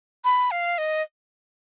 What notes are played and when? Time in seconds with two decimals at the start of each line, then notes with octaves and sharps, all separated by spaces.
0.25 B5
0.51 F5
0.78 D#5